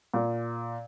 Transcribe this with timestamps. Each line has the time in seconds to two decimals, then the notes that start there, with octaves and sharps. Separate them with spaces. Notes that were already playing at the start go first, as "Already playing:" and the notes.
0.14 A#2